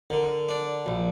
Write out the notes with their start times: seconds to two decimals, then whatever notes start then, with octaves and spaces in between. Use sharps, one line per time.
0.10 D3 A#4
0.49 D4
0.86 A#1